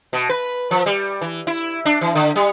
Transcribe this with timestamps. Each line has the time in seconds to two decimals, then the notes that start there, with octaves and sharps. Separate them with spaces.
0.13 B2
0.29 B4
0.71 F3
0.86 G3
1.21 E3
1.47 E4
1.85 D4
2.01 E3
2.15 D3
2.36 G3